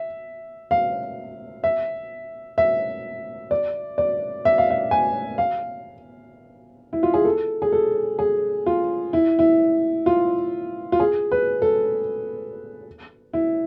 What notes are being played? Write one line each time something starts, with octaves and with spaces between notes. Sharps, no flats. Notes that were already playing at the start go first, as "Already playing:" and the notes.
Already playing: E5
F5
E5
E5
D5
D5
E5
F5
E5
G#5
F5
E4
F4
G#4
A4
G#4
A4
G#4
F4
E4
E4
F4
F4
G#4
B4
A4
E4